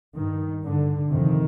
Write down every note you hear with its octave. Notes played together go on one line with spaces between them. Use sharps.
G2 D#3
G2 D3
F2 C3 D#3